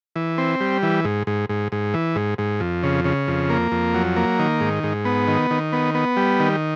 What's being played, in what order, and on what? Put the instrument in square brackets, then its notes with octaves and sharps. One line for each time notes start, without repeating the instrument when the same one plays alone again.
[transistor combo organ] E3
C4
G3
E3
G#2
G#2
G#2
G#2
E3
G#2
G#2
F2
C#3
C#3
F2
A#3
F2
F#3
A#3
D#3
G#2
G#2
B3
D#3
D#3
B3
B3
G3
D#3